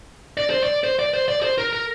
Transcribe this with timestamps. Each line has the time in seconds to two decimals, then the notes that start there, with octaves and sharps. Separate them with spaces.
0.37 D5
0.50 C5
0.63 D5
0.84 C5
0.99 D5
1.14 C5
1.28 D5
1.43 C5
1.58 A#4
1.73 A#4